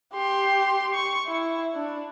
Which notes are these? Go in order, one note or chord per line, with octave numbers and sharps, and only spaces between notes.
G4 C6
C#6
E4
D4